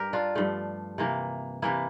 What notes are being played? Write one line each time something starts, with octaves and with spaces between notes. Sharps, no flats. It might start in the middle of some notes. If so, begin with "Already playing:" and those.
Already playing: G2 G4 A#4
D4 F4
G2 F3 A3
C3 E3 A#3
C3 E3 A#3 E4